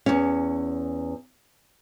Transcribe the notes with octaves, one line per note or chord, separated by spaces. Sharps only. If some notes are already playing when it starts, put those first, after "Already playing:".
E2 C#4